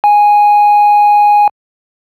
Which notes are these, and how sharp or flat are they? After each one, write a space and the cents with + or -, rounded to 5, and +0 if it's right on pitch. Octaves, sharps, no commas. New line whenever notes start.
G#5 -5